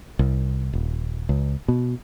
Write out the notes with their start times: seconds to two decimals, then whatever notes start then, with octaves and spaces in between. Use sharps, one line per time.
0.19 C2
0.73 D#1
1.29 C#2
1.68 B2